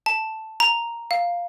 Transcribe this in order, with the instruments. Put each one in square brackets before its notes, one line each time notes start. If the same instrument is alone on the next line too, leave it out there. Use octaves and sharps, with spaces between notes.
[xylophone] A5
A#5
F5